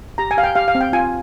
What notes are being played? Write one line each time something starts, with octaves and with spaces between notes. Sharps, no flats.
G4 A#5
G#5
G4 F5
G5
G4 F5
F5
C4
G5
F4 G#5